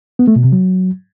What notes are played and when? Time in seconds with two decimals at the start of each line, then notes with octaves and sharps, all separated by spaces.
0.19 B3
0.28 A3
0.36 B2
0.44 C3
0.52 F#3